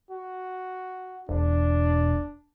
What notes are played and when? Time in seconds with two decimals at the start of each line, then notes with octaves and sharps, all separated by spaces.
0.11 F#4
1.29 E1 D4